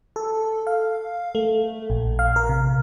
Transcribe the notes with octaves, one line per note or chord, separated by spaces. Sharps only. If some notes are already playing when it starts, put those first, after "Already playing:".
A4
F5
A3
A#1
F5
A#4
C3